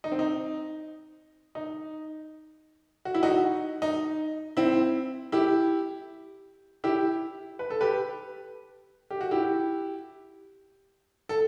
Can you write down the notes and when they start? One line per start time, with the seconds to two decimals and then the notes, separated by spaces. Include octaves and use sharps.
0.04 D#4
0.12 C4
0.19 D#4
1.55 D#4
3.05 F#4
3.15 E4
3.23 D#4 F#4
3.82 D#4
4.57 C4 E4
5.32 E4 G4
6.84 E4 G4
7.59 B4
7.70 A4
7.81 G4 B4
9.10 G4
9.21 F#4
9.31 E4 G4
11.29 A4